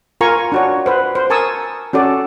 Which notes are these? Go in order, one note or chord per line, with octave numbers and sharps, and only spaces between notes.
F4 A#4 G#5 A#5 C#6
D4 F#4 C#5
B4 C5
C5
A#4 G#5 A5 C#6 D#6 E6
C#4 F#4 A4 D5